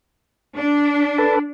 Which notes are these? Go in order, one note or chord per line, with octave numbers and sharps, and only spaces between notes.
D4
A4 B4 A5